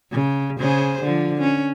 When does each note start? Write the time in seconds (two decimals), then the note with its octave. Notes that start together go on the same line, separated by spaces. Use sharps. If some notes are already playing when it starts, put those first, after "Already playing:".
0.12 C#3
0.60 C#3 G#4 C5
1.03 D3 F3
1.41 C#4